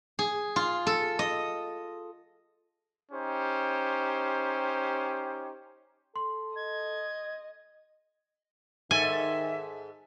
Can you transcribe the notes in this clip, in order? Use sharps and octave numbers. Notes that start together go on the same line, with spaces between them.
G#4
F4
A4
D#5
C#4 D#4 G4 C5
A4 C6
D#5 G#6
G#2 D#3 A4 E5 G#5